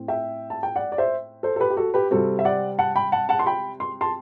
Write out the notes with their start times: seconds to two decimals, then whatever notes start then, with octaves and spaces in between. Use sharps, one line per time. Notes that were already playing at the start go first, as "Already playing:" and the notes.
Already playing: A2 C4
0.08 E5 G5
0.50 A5
0.63 G5
0.76 D5 F#5
0.92 D5
0.98 C5 E5
1.43 A4 C5
1.56 A4
1.60 G4 B4
1.70 G4
1.77 F#4 A4
1.94 G4 B4
2.11 C3 G3 C4 F#4 A4
2.39 E5
2.45 D5 F#5
2.79 F#5 A5
2.96 G5 B5
3.12 F#5 A5
3.29 F#5 A5
3.39 C6
3.46 G5 B5
3.80 C6
4.01 A5 C6